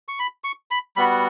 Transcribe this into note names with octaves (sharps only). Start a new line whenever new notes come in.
C#6
B5
C#6
B5
G3 B3 F#4 B5